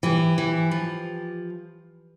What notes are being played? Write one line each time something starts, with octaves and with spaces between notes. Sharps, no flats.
E3 G4
E3
F3